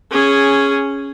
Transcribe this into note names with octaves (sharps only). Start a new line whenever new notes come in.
C#4 G#4